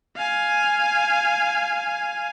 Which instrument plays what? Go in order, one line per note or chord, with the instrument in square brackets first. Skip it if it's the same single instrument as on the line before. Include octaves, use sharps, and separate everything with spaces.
[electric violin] F5 G#5